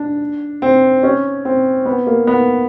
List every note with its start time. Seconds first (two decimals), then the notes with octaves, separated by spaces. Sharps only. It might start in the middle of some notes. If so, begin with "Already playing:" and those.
Already playing: D4
0.62 C4
1.03 C#4
1.45 C4
1.86 B3
2.07 A#3
2.27 B3